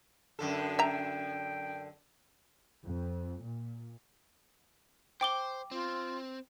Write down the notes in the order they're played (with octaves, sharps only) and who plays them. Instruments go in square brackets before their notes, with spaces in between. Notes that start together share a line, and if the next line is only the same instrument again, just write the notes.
[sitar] F#2 D3 A4
[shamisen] E5 A#5 [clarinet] G5
[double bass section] F2
A#2
[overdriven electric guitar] C5 [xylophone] G5 D6 G7
[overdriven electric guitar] C4 [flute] F4